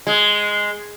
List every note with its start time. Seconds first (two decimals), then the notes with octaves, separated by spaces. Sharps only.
0.07 G#3